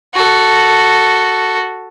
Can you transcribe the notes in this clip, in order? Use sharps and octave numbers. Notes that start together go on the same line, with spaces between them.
F#4 A4